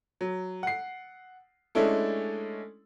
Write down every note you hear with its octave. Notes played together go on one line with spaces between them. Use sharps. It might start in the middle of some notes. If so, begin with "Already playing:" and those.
F#3
F#5 C7
G#3 A3 C#4 D4 E4 A4